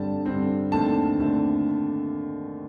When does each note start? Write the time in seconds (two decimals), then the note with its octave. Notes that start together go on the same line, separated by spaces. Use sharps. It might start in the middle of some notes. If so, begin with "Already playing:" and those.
Already playing: G2 D3 G3 C4 A5
0.26 G2 D3 G3 C4
0.72 D#2 D3 A3 C4 A5
1.18 D#2 D3 A3 C4